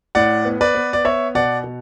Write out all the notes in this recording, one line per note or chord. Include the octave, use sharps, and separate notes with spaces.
A2 D5 F#5
B3
B4 D5
B3
D5
B3 C#5 E5
B2 D5 F#5
B2